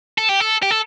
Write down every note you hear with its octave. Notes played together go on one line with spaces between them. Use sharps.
A4
G4
A4
G4
A4